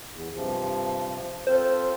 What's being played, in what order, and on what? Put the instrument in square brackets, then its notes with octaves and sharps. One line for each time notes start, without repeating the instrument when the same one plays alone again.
[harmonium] E2
G2 C3 F3
[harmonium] C4 F4 A4 [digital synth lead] C5